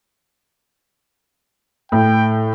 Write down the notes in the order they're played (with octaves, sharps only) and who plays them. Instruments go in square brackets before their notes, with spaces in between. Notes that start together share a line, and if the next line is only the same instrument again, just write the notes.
[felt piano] A2 [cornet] G5